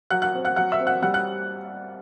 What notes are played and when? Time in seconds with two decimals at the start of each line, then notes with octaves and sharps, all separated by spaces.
0.10 F#3 F#5 F#6
0.22 F#5 F#6
0.34 C4
0.45 F#5 F#6
0.56 F#3 F#5 F#6
0.72 E5 E6
0.79 C4
0.87 F#5 F#6
1.02 G3 F#5 F#6
1.14 F#5 F#6